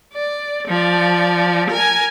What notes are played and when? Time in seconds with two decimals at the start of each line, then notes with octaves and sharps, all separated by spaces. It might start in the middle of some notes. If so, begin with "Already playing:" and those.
0.14 D5
0.68 F3 D5
1.70 A#4 G#5